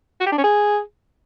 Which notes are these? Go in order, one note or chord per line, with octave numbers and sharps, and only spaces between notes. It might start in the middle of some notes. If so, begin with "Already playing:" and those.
F#4
G4
D4
C#4
G#4